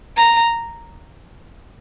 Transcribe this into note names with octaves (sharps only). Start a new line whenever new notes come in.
A#5